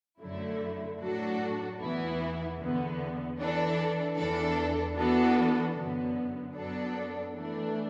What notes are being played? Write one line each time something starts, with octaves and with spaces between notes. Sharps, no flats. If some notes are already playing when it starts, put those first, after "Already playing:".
F#2 D3 F#3 A3 E4
A2 F#3 D4 F#4 A4
E2 E3 B3 E4
E2 D3 B3
E3 D4 A4
E2 E3 D4 A4
E3 B3 D4 F#4 A4
F#2 D3 B3
F#2 F#3 B3 D4 A4
E3 A3 D4